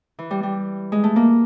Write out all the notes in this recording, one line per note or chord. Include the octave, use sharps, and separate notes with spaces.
E3
G3
G3
G#3
A3
A#3